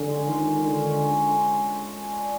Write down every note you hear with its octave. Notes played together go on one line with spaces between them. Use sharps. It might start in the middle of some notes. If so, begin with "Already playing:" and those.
Already playing: D3 C#4
G#3
D#3 F4
G#3
D3 C#4
C#4
G#3
G#3
A4
A4
G#3
C#4
D4